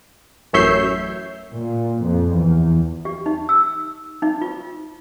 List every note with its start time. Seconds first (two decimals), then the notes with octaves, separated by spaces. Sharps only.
0.53 A1 F#2 C#5 E5 G6 C7
1.54 A#2
2.02 F2
2.32 E2
3.05 G4
3.26 D#4
3.49 E6
4.22 D#4
4.41 F4